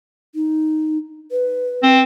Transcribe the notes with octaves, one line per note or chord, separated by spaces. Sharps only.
D#4
B4
C4